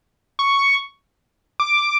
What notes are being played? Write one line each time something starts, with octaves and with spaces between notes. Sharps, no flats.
C#6
D6